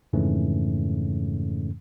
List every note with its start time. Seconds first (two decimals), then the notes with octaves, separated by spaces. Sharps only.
0.13 F2 G#2 C#3 E3 A3 C#4